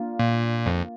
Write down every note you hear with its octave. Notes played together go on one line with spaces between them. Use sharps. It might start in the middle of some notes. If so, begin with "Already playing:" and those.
Already playing: A#3 D4 F4
A#2
F2